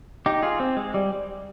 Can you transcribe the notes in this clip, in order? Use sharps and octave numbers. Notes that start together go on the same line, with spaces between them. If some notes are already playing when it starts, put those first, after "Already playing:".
D#4 G4
F4 G#4
C4
G#3
G3